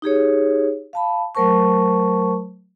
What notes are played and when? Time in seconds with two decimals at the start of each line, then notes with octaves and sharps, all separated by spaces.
0.02 D#4 G4 G#4 C#5
0.93 F5 A5 B5
1.35 F#3 A3 A#4 C5 A5 C#6